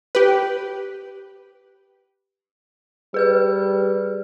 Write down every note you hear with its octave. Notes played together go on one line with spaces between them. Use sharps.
G4 B4
G3 G#4 B4 F6